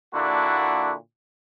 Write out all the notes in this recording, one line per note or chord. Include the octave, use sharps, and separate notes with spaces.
A#2 D3 A#3 D4 E4 F#4